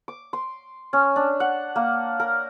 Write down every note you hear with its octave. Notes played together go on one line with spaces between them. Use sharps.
D6
C6
C#4
D4
F#5
A#3
A#4